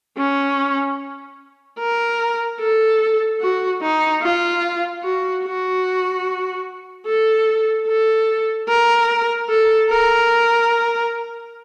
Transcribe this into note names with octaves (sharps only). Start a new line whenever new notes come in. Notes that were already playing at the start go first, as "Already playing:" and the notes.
C#4
A#4
A4
F#4
D#4
F4
F#4
F#4
A4
A4
A#4
A4
A#4